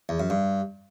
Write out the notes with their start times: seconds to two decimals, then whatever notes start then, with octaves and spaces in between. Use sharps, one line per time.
0.09 E2
0.20 F#2
0.30 G2